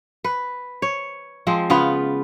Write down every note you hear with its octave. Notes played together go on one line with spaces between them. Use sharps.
B4
C#5
F3 G#3 C4
C#3 B3 F4 B4